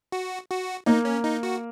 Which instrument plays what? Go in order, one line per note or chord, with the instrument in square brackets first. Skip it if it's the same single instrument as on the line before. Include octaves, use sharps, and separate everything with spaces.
[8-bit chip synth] F#4
F#4
[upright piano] A#3 [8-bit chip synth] D#4
[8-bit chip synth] C#4
D#4
F#4